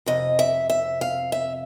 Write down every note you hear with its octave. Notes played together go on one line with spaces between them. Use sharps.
F2 C3 D#5
E5
E5
F5
E5